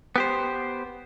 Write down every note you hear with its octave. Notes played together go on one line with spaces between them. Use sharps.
B3 G4 C5